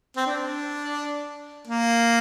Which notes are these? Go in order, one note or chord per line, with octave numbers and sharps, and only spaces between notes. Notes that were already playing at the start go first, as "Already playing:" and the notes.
C4
D4
A#3